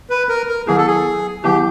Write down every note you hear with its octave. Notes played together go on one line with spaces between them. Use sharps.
B4
A#4
A#4
D#3 F#3 B3 E4 G#4
A4
G#4
D#3 F#3 B3 E4 G4